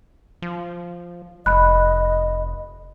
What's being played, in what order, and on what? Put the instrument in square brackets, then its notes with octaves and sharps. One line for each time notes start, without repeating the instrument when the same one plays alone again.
[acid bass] F3
[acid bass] F1 [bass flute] D#5 [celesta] B5 F#6